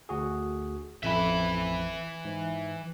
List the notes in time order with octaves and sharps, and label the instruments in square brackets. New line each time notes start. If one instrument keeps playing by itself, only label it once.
[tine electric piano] D2 F#4 G#4
[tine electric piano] A1 F2 B5 [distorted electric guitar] E3 E5
[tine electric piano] G#2